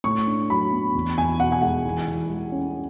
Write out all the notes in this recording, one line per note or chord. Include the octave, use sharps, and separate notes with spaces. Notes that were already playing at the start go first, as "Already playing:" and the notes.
A2 C#6
D4
F#3 B5
B3
E2
E2 G#5
B2 F#5
G#5
G#3 F#5
E3
E3
G#3
C#4